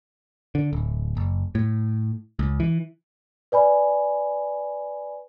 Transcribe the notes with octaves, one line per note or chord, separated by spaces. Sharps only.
D3
D1
F#1
A2
C#2
E3
B4 D5 G#5 B5